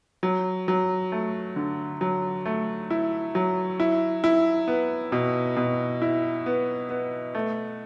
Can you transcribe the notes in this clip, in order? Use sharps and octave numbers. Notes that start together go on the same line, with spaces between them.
F#3
F#3
A3
D3
F#3
A3
E4
F#3
E4
E4
B3
B2
B2
E4
B3
B3
A3